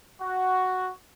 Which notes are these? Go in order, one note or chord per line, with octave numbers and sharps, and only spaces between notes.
F#4